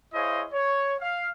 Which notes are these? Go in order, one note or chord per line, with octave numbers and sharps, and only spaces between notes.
E4 G#4 C5 C#5 D#5 F5
C#5
F5